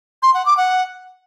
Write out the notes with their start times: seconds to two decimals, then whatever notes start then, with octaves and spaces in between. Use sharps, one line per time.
0.23 C6
0.34 F#5
0.46 D6
0.57 F#5